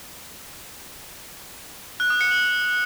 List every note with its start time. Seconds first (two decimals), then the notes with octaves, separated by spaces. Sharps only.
2.00 F#6
2.10 D#6
2.21 C#7
2.31 F#7